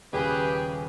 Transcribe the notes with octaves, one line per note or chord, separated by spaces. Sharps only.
D#1 C#3 G4 G#4 B4